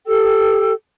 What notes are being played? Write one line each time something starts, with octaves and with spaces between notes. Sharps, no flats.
G4 A4 G5 E6